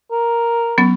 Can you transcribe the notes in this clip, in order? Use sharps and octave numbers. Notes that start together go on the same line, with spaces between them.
A#4
F#3 B3 C#4